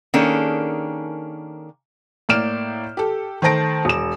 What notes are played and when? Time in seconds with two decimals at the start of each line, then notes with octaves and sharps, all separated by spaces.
0.14 D#3 A#3 C#4 D4 G#4 A4
2.29 A2 A#3 D5 F6 D7 E7
2.97 G4 A4
3.42 D#3 A3 C5 A5 A#6 D7
3.85 E1 E7